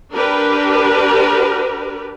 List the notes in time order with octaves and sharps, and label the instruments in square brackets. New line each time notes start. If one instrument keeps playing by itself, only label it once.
[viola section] D4 G4 A#4 B4